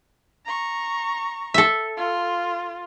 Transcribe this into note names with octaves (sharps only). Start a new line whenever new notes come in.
A#5 C#6
A4 E5
F4